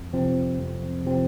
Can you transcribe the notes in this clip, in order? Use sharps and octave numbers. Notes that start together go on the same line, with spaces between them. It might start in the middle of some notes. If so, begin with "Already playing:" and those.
Already playing: F2
C3 F3 C4
F2
C3 F3 C4